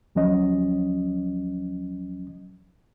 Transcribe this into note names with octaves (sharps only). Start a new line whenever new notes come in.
D2 F3 F#3 C#4 D#5